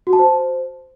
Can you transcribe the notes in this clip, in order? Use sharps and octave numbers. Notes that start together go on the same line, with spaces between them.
F#4
A5
C5